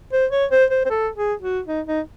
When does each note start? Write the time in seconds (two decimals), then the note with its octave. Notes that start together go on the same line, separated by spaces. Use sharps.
0.13 C5
0.32 C#5
0.51 C5
0.70 C5
0.85 C5
0.90 A4
1.16 G#4
1.42 F#4
1.67 D#4
1.87 D#4